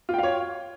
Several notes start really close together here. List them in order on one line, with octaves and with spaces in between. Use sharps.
F4 G5 F5 C#5